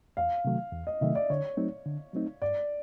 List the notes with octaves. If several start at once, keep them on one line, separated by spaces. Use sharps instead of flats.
E2 F5
C3 D#3 F#3 A3
E2
D#5
C3 D#3 F#3 A3 E5
D5
D3 C#5
F#3 A3 C4 D#4
D3
F#3 A3 C4 D#4
G2 D5